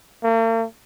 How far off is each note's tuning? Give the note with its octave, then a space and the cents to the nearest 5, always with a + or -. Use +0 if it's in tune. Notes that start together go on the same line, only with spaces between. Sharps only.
A#3 -45